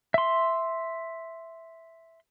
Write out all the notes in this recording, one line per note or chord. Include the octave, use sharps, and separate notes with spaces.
E5 C6